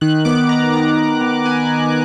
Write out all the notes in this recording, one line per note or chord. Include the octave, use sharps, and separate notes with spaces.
D#3 F#6
B3 D6
B3 A#5
B3 A#5
D#3
B3
B3 G#5
B3